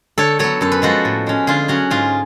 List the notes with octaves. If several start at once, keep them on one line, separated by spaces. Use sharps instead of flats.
D3 A4 C#5
F#3 B3 A4 C#5
F#2 A4
B4
F3 G#3 F#4 A4
A2
G#3 C#4
D3 F4 G#4
F#3 C#4 F#4
G#2 F4 G#4